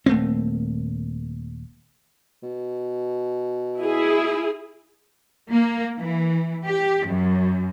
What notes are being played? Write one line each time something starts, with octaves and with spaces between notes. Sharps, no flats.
D#1 A3 A#3 C4
B2
E4 G#4
A#3
E3
G4
F#2